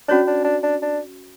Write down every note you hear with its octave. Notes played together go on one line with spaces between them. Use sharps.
C#4 D4 F#4 C#5
D4
D4
D4
D4